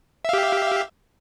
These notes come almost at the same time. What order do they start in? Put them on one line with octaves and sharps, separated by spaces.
E5 F5 G4